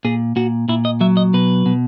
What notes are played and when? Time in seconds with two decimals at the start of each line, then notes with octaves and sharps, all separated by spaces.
0.05 A#2 G#4
0.36 A#2 F#4
0.69 A#2 E4
0.85 D#5
1.01 F#3 E5
1.17 D#5
1.34 B2 B4
1.66 B2